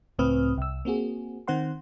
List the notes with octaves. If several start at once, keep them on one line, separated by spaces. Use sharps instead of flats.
C#2 A2 C4 B4 D#6 F6
C2 E6
A#3 C4 F#4 G#4
D#3 C4 C5 F#5 C6